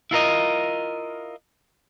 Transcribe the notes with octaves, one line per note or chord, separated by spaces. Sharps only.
E4 F4 A#4 D#5